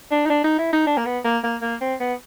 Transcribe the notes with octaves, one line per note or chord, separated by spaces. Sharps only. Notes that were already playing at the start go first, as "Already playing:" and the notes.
D4
D#4
D4
D#4
E4
D#4
D4
A#3
B3
A#3
A#3
A#3
C4
B3